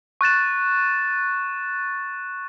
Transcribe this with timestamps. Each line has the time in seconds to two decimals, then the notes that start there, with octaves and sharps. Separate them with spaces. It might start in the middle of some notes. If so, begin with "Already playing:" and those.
0.21 C#6 F#6 A6 E7